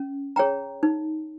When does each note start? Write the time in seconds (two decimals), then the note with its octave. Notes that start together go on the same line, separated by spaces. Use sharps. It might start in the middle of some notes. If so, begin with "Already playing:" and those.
Already playing: C#4
0.36 G#4 C#5 G5 A#5
0.83 D#4